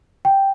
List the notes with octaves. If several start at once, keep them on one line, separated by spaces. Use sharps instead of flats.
G5